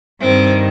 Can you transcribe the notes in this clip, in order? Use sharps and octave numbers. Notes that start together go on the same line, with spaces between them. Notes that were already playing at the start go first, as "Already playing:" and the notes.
G2 D#3 C4